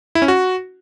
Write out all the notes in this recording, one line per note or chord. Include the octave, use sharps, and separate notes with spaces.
E4
C#4
F#4